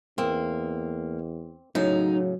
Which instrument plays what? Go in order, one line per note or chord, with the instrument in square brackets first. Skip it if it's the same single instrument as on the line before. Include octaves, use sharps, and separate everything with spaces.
[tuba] E2 [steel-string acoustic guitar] A#3 [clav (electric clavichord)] C4
[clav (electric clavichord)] A2 C#3 [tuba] F#3 [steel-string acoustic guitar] D#4